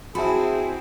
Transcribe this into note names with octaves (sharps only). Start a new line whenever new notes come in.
C4 E4 F#4 G#4 E5 A5 B5